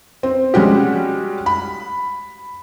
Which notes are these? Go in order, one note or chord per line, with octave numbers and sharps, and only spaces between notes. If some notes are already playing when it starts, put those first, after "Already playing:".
C4
G3 G#3 C#4 F#4 G4
B5